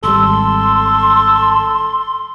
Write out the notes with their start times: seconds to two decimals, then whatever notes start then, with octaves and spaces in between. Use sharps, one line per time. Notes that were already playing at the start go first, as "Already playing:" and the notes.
0.04 G#1 G3 A4 C6